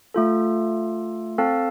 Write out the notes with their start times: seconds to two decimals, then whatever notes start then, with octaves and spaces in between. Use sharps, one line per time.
0.14 A3 F4 A4
1.38 C4 A4 F5 A5